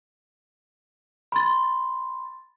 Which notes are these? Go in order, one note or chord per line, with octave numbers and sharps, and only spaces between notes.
B5 C6 A6